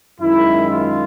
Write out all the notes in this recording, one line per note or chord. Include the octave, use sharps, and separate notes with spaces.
F#2 D#3 G#3 E4
F4